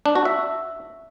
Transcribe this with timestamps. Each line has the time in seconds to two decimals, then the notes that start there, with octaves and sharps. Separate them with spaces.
0.06 D4
0.15 F#4
0.25 E5